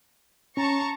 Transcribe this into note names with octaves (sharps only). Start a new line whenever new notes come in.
C#4 A5 A#5 C#6